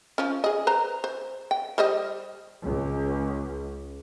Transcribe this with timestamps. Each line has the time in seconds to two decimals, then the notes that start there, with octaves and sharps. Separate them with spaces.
0.18 F3 C#4
0.44 G#4 D#5
0.67 B4 C5 A#5
1.04 C5
1.51 G5
1.78 G3 C5 D#5
2.61 C#2